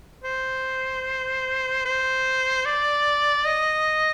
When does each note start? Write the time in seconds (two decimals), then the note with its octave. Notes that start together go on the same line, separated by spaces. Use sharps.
0.24 C5
1.85 C5
2.66 D5
3.45 D#5